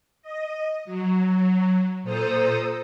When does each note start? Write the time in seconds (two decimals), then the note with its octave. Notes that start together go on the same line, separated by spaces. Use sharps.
0.22 D#5
0.85 F#3
2.03 A#2 A4 C5 A#5 D#6